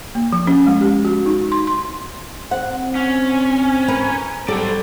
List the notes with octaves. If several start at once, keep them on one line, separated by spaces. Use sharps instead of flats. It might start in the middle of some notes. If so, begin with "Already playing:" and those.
A#3
F3
C#4
G#3
G4
F#4
D#4
C6
C6
C4 F#5
C#4
A#4 B4
F#3 G3 G4 A4 C5 D5